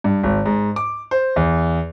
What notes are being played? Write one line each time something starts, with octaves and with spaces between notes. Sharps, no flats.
G2
G#1
G#2
D6
C5
E2